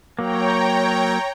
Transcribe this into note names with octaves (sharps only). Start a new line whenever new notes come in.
F#3 A#3 C#5 G5 A#5